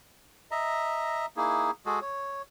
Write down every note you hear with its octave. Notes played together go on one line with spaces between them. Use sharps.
D#5 E5 A#5
A#3 D#4 E4 G#4
G#3 F#4 G#4 A4
C#5